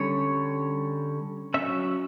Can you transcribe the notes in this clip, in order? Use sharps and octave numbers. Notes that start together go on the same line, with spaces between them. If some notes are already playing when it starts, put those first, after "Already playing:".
Already playing: D3 G3 C#4 C#5
F#3 C#4 E5